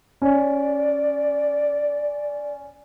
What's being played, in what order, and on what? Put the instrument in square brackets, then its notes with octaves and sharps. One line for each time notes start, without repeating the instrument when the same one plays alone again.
[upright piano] C#4 [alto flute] D5